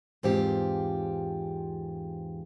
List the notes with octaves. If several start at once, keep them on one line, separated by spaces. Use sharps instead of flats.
E2 G#2 C4 F4 G4